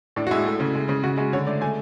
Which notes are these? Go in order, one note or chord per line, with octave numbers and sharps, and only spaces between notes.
A2 D4
F#4
G#3 E4
A3
C#3
G#3
C#3
C#3 F#4
G#3 F#4
D3 C#5
A3 D5
A3 G#5